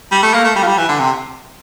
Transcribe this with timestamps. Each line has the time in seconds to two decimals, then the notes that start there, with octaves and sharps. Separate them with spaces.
0.11 G3
0.23 A3
0.34 A#3
0.44 A3
0.56 G3
0.62 F3
0.67 G3
0.78 E3
0.89 D3
1.00 C3